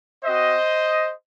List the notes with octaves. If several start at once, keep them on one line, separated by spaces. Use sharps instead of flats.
C4 F#4 C5 D#5